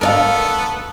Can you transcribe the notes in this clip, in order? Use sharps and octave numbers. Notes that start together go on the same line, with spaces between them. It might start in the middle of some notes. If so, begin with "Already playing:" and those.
A3 B3 A4 A#4 D5 F5